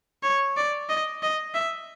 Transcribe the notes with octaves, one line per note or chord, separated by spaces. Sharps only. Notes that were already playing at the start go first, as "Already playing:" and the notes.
C#5
D5
D#5
D#5
E5